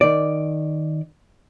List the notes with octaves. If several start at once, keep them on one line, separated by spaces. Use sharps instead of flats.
D#3 D5